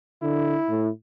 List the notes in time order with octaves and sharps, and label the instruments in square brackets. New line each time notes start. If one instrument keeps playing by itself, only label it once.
[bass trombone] D3 [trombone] E4
[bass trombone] A2